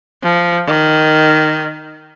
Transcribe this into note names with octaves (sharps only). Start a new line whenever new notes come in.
F3
D#3